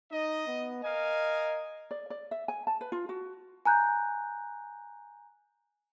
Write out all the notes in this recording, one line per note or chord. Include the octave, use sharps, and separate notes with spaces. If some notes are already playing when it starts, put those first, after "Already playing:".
D#4 D#5
B3
A#4 D#5 F5 G#5
D5
D5
E5
G#5
A5
B4
F4
F#4
G#5 A#5 F#6 G6